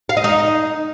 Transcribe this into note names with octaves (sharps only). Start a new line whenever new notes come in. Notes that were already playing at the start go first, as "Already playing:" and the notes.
F5
D#5
D#4